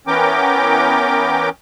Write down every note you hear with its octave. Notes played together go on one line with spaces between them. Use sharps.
E3 B3 C#4 A#4 G5 D6